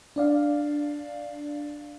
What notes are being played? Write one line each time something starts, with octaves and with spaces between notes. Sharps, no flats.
D4 D5 F5